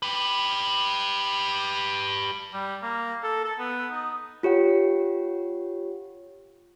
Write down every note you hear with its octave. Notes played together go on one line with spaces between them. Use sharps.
G4 B4
G3
A#3
A4
A4
B3
D#4
F4 G4 C#5 F#5